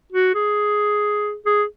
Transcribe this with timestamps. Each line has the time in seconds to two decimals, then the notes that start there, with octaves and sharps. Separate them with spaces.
0.12 F#4
0.35 G#4
1.46 G#4